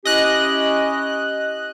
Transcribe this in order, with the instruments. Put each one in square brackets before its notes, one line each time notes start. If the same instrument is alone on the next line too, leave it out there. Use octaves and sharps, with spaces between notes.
[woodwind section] C#4 E4 G4 [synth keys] D#5 F#6